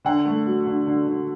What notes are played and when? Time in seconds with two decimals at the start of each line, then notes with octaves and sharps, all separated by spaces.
0.05 D3 F#5
0.26 A3
0.47 F#3
0.66 D3
0.87 D3
1.07 D3